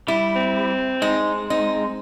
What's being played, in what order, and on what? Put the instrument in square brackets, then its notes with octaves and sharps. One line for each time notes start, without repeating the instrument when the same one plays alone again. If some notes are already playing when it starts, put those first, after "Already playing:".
[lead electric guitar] G3 [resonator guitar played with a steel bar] E4
[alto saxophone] C4
[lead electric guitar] G#3 [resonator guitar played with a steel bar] D#4
[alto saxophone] C4 [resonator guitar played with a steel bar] D#4